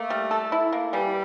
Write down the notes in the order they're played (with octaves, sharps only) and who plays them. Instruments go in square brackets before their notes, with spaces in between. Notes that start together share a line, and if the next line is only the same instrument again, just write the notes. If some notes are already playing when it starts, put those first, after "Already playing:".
Already playing: [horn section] A3 [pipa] A#3
[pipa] G3
A4
E4
A#3
[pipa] E3 [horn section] G3